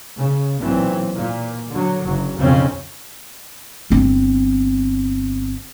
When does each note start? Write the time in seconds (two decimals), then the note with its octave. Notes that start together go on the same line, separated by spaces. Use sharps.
0.18 C#3
0.60 B1 A#2 E3 F#3 C4
1.14 A#2
1.70 D3 F#3
2.04 F#1 F#3
2.37 B1 F2 C#3 C4 C#4
3.90 G1 C4